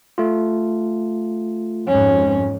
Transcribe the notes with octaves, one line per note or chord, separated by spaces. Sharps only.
A3 F4
F2 G#2 C#4